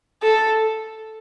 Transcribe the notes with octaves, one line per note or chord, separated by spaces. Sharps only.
A4